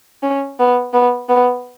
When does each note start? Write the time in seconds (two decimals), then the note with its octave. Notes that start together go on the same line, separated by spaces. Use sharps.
0.23 C#4
0.59 B3
0.93 B3
1.29 B3